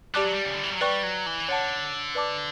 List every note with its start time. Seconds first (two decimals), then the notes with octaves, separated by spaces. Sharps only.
0.14 G3 G4 D5 A5 D6 F#6
0.24 F#3
0.33 G3
0.45 C#3
0.54 D3
0.64 E3
0.72 F#3
0.81 G3 B4 D5 G5 C#6 F#6
1.03 F#3
1.26 E3
1.48 D3 C#5 F#5 A5
2.15 B4 D5 A5 D6